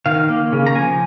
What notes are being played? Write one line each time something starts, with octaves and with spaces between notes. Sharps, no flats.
D#3 F5
A#3
C#3
A#5
F3 G#5